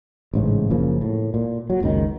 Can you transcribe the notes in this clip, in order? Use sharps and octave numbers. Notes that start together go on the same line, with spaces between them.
A1 G#2 C#3
F#1 C#3 F3 A#3
A2
A#2
F#3
F#1 C#2 A2 D#3